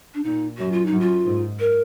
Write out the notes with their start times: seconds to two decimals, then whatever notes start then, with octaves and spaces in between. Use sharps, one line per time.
0.14 D4
0.23 A#2 D#4
0.58 F#2 F#4
0.72 F4
0.86 D#4
0.92 F#2
1.00 F4
1.25 G#2
1.59 A#4